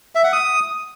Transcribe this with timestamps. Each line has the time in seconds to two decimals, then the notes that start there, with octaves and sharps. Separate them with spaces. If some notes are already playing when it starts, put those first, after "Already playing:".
0.15 E5
0.24 F#5
0.33 D#6